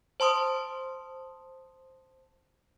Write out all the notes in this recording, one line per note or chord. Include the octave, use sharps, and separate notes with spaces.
C5 A5 C6 D#6